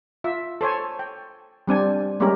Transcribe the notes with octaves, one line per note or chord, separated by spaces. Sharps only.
F4 E5
A4 C5 C#5 G#5
G5
G3 C4 D4 G#5
G3 G#3 A#3 C#4 G4 A#4